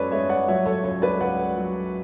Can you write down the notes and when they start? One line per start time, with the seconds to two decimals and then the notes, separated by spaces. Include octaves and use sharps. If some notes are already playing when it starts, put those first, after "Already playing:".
Already playing: F#2 G#3 A4 B4 C#5 D5
0.11 G#3 C#5 E5
0.29 D5 F#5
0.48 F#3 C#5 E5
0.66 A4 C#5
0.84 C#2 A4 C#5
1.02 B4 D5
1.20 C#2 D5 F#5
1.57 F#3